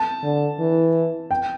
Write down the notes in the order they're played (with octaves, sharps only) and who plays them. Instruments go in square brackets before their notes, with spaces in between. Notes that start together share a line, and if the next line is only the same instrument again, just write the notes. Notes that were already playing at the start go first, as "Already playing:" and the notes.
Already playing: [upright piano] A5
[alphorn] D3
E3
[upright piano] G5